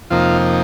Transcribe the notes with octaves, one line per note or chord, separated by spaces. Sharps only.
F2 C3 F3 A#3 D#4 F4